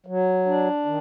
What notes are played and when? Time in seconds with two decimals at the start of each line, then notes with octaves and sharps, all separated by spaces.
0.06 F#3
0.46 D4
0.85 D#3